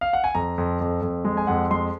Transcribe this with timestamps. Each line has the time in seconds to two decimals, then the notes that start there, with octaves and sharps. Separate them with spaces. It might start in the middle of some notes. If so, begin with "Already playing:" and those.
0.01 F5
0.13 F#5
0.24 G#5
0.35 F2 A#5
0.58 F2
0.81 F2
1.02 F2
1.25 G#3
1.37 G#5
1.47 F2 F#5
1.71 G#3 C6